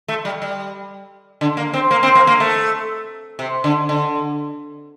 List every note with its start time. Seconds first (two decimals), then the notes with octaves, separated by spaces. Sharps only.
0.08 A3
0.25 G3
0.42 G3
1.41 D3
1.57 A#3
1.74 C4
1.91 A#3
2.03 C4
2.15 A#3
2.27 A#3
2.40 A3
3.39 C3
3.64 D3
3.89 D3